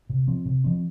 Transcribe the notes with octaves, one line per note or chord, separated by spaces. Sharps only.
C3
F3 C4
C3
F3 C4